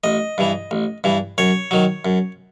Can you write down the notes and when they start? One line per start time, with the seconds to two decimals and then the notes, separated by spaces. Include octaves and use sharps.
0.04 A1 D#5
0.38 G2 E3
0.71 A1
1.04 G2 E3
1.38 F#2 C#5
1.71 D#3 F#3
2.05 F#2